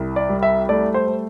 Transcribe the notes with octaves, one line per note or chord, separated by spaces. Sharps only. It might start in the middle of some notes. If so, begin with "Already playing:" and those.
Already playing: C2
D5
G3
E5
A3 D5
C5
A3